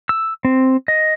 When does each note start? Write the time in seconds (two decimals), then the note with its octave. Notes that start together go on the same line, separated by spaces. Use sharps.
0.09 E6
0.45 C4
0.88 D#5